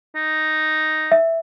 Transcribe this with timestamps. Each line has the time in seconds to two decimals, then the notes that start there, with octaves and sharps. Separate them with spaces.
0.15 D#4
1.12 E5